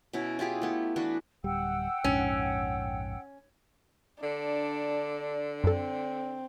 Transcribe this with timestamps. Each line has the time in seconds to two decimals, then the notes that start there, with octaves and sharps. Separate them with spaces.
0.13 B2 C#4 E4
0.39 E4 F4 G4 G#4
0.62 A3 B3
0.96 E3 D4 F#4 B4
1.44 D1 G3 F#5 G5 E6
2.04 A#1 F2 G#2 C#4
4.23 D3 D4
5.64 F#2 C4 A4